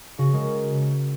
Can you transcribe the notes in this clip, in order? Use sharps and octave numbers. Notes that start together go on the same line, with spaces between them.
C#3 F#4
G#3 A#4